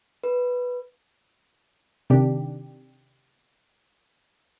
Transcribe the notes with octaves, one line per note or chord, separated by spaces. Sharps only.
B4
C3 D#3 D4 G4